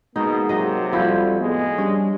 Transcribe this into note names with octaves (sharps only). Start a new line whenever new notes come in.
B2 G#3 A#3 D#4
C3 F#3 D#5
F2 F3 G3 E4 F#4
A2 G#3 B3
G3 C#4 D4